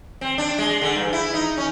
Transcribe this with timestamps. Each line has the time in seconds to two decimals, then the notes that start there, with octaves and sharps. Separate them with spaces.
0.21 C4
0.38 D4
0.58 G#3
0.82 D3
0.96 G2
1.13 E4
1.34 D#4
1.57 C#4